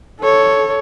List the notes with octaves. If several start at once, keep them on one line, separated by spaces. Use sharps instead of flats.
A4 C#5